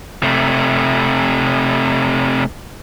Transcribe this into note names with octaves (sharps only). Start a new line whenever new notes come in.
C3 A3